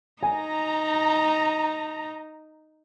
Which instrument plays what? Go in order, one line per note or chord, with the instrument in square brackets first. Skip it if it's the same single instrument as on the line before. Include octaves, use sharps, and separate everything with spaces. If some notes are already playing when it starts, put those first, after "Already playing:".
[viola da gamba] D#4 [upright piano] G#5 [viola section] A#5